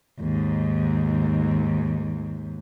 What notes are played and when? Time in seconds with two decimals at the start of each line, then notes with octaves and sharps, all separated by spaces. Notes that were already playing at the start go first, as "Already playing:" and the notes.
0.19 D#2 G#2